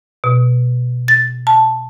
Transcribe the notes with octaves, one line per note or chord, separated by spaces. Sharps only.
B2
A6
A5